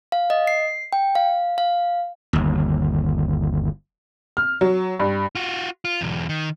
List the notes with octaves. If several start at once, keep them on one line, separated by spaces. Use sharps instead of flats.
F5
D#5
C7
G5
F5
F5
G1 D#2
F6
F#3
G2
F4 F#4
F4
B1 E2
D#3